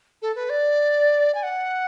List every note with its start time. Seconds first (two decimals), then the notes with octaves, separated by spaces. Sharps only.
0.22 A4
0.36 B4
0.50 D5
1.35 G#5
1.43 F#5